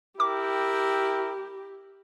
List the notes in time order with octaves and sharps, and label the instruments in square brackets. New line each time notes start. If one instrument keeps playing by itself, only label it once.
[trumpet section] E4 A#4 G5 [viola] G4 [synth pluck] D6